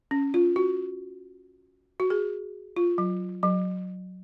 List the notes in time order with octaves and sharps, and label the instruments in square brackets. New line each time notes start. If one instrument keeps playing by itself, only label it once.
[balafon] C#4
F4
F#4
F#4
G#4
F4
F#3
F#3